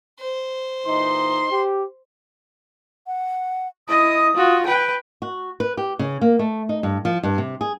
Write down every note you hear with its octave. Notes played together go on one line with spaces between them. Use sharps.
C5
A#2 E3 D#4 C6
G4
F#5
E4 D#5 D#6
F4 F#4
B4 G5
F#4
B4
G4
C#3
A#3
A3
D#4
G2
F3
G2
C3
G#4